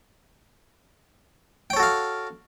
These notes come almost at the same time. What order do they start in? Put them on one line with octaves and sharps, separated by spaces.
G5 C#5 A4 F#4 F5